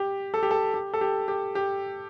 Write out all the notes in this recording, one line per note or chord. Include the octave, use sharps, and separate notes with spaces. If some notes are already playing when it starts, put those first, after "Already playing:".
Already playing: G4
A4
G4
A4
G4
A4
G4
G4
G4